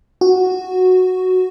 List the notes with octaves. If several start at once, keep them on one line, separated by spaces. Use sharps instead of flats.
F#4